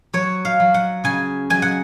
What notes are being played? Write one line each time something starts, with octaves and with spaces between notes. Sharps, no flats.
F#3 C#5
F5
F#3
F#5
C#3 G#5
F#3 G#5
F#5